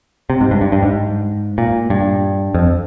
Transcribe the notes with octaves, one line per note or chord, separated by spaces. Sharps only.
C3
G#2
G2
G2
G2
G#2
A#2
G2
F2